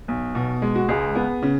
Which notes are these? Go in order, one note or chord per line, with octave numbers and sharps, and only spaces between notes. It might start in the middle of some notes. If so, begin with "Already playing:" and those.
B1
B2
G#3
F#4
C#2 G#4
B3
C#3